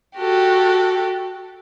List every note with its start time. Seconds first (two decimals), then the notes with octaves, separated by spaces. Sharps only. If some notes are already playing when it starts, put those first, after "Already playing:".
0.16 F#4 G4 A4